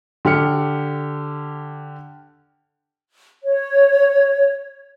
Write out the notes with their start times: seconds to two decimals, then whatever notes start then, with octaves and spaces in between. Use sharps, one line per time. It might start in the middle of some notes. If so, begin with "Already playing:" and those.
0.25 D3 G4 F6 C#7
3.44 C#5